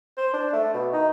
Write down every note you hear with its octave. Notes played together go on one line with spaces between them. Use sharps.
C5
D4
A3
B2
D#4